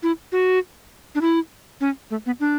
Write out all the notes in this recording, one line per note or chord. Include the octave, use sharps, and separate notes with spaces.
E4
F#4
D4
E4
C#4
A3
B3
D4